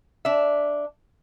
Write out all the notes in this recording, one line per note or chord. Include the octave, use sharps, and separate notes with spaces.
D4 E5